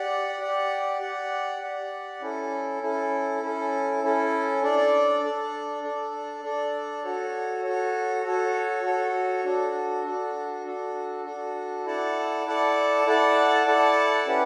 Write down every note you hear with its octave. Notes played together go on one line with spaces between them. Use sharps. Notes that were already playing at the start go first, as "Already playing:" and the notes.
Already playing: G4 D5 F#5
G4 D5 F#5
G4 D5 F#5
G4 D5 F#5
C#4 E4 A4
C#4 E4 A4
C#4 E4 A4
C#4 E4 A4
D4 A4 D5
D4 A4 D5
D4 A4 D5
D4 A4 D5
F#4 A4 C#5
F#4 A4 C#5
F#4 A4 C#5
F#4 A4 C#5
D4 F#4 A4
D4 F#4 A4
D4 F#4 A4
D4 F#4 A4
E4 A4 D5 F#5 A5
E4 A4 D5 F#5 A5
E4 A4 D5 F#5 A5
E4 A4 D5 F#5 A5
C#4 E4 G4 B4 F#5